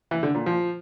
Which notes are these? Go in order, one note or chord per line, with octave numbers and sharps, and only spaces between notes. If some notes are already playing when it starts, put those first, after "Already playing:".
E3
D3
A#2
F3